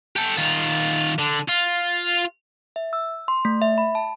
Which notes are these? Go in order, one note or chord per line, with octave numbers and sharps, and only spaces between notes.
G4 A4
D#3 F4
D3
F4
E5
E6
C6
A3
E5
B5
A5